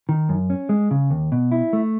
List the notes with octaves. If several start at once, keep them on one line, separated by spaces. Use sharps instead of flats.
D#3
F#2
C#4
G#3
C#3
D#2
B2
E4
A3